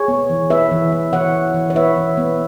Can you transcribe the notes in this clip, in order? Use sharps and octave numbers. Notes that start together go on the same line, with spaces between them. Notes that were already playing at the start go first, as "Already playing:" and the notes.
Already playing: G#4 C#5
B3
E3
B3 B4 E5
E3
B3
E3 C#5 F#5
B3
E3
C#5
B3 B4 E5
E3
B3